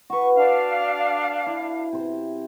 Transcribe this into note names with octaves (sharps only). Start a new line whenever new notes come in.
F#4 B4 C#6
D4 F5
E4
C3 C5